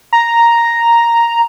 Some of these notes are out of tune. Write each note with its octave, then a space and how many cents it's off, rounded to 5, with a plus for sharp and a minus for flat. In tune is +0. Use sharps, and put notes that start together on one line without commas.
A#5 +0